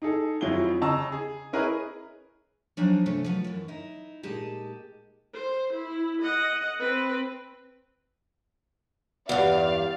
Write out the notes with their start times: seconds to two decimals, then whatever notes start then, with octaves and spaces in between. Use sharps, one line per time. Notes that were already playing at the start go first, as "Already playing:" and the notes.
0.02 D#4 G#4 A4
0.41 F2 F#3 E4 F4 G#4 G7
0.81 C#3 D#5 A5 A#5 E6
1.12 G#4
1.53 C#4 E4 G#4 A#4 B4 D#5
2.77 F3 F#3 D4 D#4 G5 G#5
3.06 C3 A3 C#4
3.25 F3 F#3 B4
3.44 F#2 E3
3.68 D#4 E4
4.23 A#2 G#3 D#4 G4 A5
5.34 C5
5.73 E4
6.22 D#5 F#5
6.80 C4 B4
9.29 E2 G2 G4 D5 F5